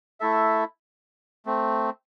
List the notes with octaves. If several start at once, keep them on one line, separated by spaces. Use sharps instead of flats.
A3 E4 A4 E5
A3 C4